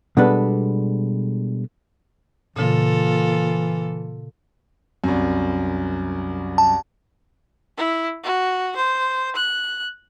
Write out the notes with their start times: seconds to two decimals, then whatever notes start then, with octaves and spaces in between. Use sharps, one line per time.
0.17 B2 G3 G#3 D4 A4 B4
2.56 A#2 C#3 E3 A#3 F4 A4
5.04 C2 F#2
6.58 A5
7.77 E4
8.24 F#4
8.76 C5
9.36 F#6